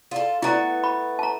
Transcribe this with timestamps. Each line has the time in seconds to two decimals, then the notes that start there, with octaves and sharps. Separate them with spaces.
0.11 F4 A4
0.42 A3 B3 E4 A#5
0.84 B5
1.19 A5 A#5